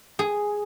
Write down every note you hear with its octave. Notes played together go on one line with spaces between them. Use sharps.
G#4